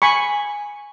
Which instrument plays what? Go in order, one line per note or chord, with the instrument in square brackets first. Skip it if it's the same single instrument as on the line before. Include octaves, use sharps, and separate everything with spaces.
[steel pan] G#5 B5 C#6